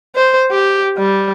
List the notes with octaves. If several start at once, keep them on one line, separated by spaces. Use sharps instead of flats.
C5
G4
G3